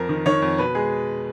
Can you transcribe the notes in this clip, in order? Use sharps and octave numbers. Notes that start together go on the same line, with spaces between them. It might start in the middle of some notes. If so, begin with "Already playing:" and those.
Already playing: F2 A#4
D#3
D#3 C#5
F2
B2 B4
G#3 G#4